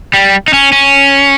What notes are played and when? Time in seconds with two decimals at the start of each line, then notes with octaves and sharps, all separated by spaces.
0.14 G3
0.48 D#4
0.53 C#4
0.72 C#4